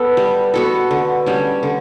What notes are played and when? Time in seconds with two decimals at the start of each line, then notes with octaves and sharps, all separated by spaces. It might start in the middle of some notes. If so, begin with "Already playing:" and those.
Already playing: B3 A4
0.17 G3
0.54 B3 F#4 A4
0.91 D3
1.26 G3 C#4
1.63 D3